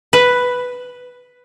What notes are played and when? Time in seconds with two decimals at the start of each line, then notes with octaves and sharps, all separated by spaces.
0.13 B4